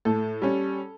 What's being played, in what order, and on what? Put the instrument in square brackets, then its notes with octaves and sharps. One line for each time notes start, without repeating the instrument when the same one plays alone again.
[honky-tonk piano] A2 A4
G3 C#4